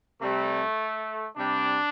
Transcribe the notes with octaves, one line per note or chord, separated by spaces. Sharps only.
C3 G3 A3
C3 G3 D4